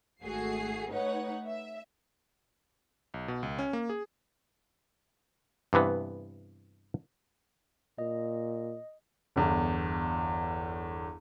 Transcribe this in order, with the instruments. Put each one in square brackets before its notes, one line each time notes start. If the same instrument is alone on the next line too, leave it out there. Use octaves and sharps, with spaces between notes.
[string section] G#1 A3 F#4 G#4 C7
A3 D#4 B4 C#5 F#5
E5
[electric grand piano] B1
B2
C#2
C#4
A#3
G#4
[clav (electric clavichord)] G2 C3 E3 B3
[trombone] A#2 [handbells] D#5
[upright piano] G1 E2